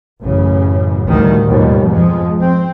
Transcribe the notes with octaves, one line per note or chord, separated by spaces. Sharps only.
A1 F#2 C#3
D2 A2 D#3 G3
D#2 G#2 B2 F3 G3
F2 F3 G#3
C4